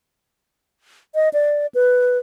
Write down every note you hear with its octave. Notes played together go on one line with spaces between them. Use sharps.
D#5
D5
B4